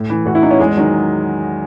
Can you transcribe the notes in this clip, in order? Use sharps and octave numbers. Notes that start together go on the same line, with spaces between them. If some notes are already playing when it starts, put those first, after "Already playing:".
Already playing: A2
E3
A2 F#4
E4
E3 D#4
C#4
E2 G#3
D#3 F#3